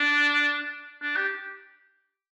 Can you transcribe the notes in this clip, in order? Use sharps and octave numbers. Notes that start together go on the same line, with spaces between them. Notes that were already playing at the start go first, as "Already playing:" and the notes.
Already playing: D4
D4
G4